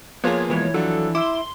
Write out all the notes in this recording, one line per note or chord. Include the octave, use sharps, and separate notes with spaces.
F3 A#3 B3 F4 G#4 C#5
B2 E3 G#3 B3 C#5
F3 F#3 D4 A4
E4 C6 D6 E6